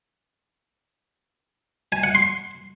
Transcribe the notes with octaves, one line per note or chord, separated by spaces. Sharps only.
G#5
F#5
C6